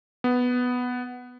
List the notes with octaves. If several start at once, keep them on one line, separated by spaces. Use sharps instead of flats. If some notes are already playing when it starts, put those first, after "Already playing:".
B3